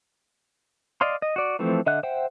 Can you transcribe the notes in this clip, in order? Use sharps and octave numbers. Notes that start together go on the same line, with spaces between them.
D5 D#5 F5 C6
D#5
F#4 D5
E3 F3 A3 C4
D3 D#5 E5 F#5 F#6
C5 E5 F#5 G5